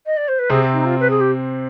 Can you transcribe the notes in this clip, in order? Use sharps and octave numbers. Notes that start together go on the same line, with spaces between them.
D#5
D5
C5
B4
C3 C4 G#4
D#4
F4
B4
G#4
G4